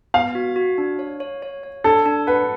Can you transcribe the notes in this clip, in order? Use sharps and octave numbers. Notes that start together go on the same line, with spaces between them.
B3 F5
F#4
F#4
D4
C#5
C#5
C#5
C#5
D4 A4
D4
B4 F#5